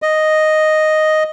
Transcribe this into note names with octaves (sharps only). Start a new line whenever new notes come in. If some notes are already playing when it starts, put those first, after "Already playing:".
D#5